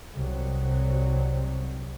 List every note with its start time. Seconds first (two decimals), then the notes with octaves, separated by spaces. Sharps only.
0.13 C2 F#3